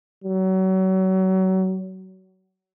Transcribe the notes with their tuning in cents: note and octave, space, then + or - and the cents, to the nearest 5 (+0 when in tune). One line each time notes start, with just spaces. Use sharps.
F#3 +30